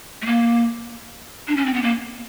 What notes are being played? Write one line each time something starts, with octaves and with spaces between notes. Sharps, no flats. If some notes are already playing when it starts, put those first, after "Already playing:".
A3
A#3
D4
C#4
C4
B3
A#3